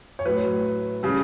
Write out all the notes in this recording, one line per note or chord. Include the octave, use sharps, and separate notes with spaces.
C#5
A2 F#3 B4
C#3 G3